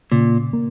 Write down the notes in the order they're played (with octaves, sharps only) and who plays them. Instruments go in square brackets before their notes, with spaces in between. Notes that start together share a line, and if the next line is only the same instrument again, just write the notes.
[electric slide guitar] A#2 [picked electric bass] C#3
[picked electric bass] A#3